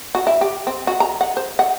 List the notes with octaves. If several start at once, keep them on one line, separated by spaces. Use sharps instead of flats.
F#4
E4
G4
C4
F#4
A#5
F#5
C5
F#5